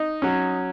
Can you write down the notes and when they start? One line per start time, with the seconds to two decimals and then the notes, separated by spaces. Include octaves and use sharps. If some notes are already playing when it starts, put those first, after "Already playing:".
Already playing: D#4
0.22 F#3 C#4